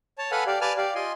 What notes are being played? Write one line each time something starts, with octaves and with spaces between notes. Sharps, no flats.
C#5 A5
A4 B4 F5 F#5 G#5 B5
G4 D5 F5
B4 D5 G#5 A5 F6
G4 D5 F5
F4 D#5 G#5 C6